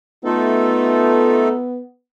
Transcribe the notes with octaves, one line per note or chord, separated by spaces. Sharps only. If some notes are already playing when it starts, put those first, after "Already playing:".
A3 B3 D#4 F4 A4